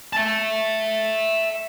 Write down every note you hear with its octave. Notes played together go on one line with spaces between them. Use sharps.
E5 A5